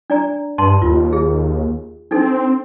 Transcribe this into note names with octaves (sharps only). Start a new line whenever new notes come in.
D4 D5 A#5
G2 A5 C6
D#2 F4
G#4
C4 D4 D#4 A4